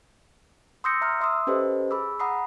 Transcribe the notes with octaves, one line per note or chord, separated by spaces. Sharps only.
C6 D#6 E6 G6 A#6 C#7
E5 A#5 C6 F6
E5 C6 D#6 E6
C#4 G4 A4 B4 C5 D#5
G#4 B5 D6 E6
F#5 A#5 B5 D#6 C7